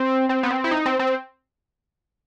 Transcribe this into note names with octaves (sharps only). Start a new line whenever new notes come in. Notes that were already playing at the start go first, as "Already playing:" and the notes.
Already playing: C4
C4
B3
C4
E4
D#4
C4
C4